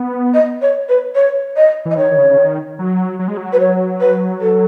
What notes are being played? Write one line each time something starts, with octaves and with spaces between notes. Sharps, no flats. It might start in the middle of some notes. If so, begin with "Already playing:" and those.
Already playing: B3
D#5
C#5
B4
C#5
D#5
E3
D#5
D#3 C#5
D#3
C#3
C#3
D#3
F#3
F#3
G#3
F#3
B4
C#5
B4
A4